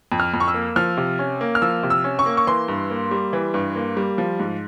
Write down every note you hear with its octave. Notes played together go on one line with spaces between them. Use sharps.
F2
F6
F2
C#6
E6
A#3
F3 F6
C3
C#4
A#3
F6
F3 E6
C3
E6
C#4
C#6
A#3
C#6
E3 C6
G2
A#3
G3
E3
G2
A#3
G3
F3
G#2